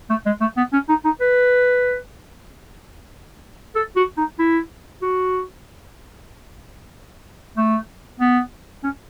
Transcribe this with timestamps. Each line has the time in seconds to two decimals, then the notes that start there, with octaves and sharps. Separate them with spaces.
0.10 A3
0.26 G#3
0.41 A3
0.57 B3
0.73 C#4
0.89 D#4
1.05 D#4
1.21 B4
3.75 A4
3.96 F#4
4.18 D#4
4.39 E4
5.02 F#4
7.57 A3
8.20 B3
8.84 C#4